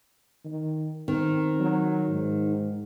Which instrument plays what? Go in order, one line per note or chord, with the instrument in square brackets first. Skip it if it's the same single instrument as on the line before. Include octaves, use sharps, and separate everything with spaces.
[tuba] D#3
[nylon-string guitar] D#3 [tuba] C4
[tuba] F#3
G#2